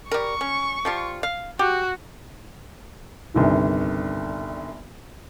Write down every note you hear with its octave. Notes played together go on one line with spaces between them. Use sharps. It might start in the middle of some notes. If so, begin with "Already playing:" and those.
G3 A#4 C#6
C#4
F3 G3 F4
F5
F#4 G4
G1 C2 D#3